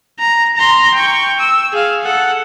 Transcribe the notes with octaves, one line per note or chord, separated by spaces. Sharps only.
A#5
A#5 C6
G5 C#6
E6
G#4 F5
A4 F#5